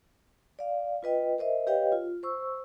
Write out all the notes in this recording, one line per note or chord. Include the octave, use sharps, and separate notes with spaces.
D5 F5
F4 B4 D#5 G5
A#4 C5 D#5 E5
G4 B4 C#5 D#5 F5 G5
F4
C5 C#6 E6